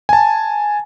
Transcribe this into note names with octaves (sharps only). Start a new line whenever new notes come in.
G#5 A5